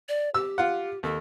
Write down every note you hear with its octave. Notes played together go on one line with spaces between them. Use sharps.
D5
G4 E6
F4 F#5
D#2 A4